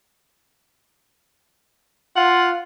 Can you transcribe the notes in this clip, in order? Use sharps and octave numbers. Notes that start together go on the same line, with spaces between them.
F4 F#5